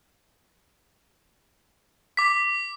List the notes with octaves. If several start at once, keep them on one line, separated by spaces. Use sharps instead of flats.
D6 B6